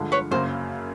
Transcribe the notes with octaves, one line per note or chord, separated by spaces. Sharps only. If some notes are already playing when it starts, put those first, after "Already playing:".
Already playing: G2 D3 F3 G#3
B4 C#5
F#2 C#3 F#3 A#3 C5